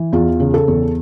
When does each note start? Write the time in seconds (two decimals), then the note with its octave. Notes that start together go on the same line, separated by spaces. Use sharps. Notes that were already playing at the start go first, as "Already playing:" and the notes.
Already playing: E3
0.13 E2 F4
0.40 C#3
0.54 A4
0.68 E2